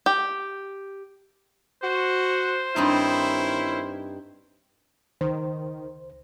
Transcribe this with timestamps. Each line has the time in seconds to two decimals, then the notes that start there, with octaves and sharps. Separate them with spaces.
0.06 G4
1.82 F#4 C5
2.76 G2 D#3 C4 C#4 D#4 E4
5.21 C#2 D#3 C5